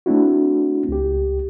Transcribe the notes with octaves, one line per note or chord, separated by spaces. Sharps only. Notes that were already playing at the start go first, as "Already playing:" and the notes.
A3 C4 D4 E4 F#4
C#2 G4